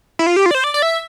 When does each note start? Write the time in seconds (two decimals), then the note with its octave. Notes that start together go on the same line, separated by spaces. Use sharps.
0.19 E4
0.26 F4
0.36 G4
0.46 F4
0.51 D5
0.55 C5
0.64 D5
0.74 D5
0.82 E5